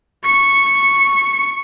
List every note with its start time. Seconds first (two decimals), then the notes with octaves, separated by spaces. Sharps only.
0.24 C#6 C#7